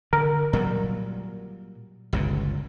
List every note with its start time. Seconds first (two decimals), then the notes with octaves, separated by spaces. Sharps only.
0.13 D3 A#4
0.53 A#2 F#3 G3
2.13 G1 C#2 A#2